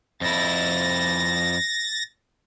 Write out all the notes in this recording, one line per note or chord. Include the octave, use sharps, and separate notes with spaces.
F2 E4 A6 A#6